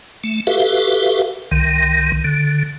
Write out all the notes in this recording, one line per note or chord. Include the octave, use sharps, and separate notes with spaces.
A3
F#4 G4 A4 B4 E5 F5
C2 D#3
D3